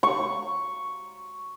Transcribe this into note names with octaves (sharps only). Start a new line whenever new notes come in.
C#6